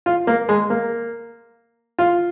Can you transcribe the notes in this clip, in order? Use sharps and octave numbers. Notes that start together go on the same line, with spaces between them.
F4
A#3
G#3
A#3
F4